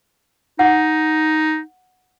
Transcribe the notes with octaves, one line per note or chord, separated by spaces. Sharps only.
D#4 F#5